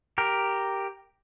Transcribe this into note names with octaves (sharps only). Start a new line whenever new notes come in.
G4 A#4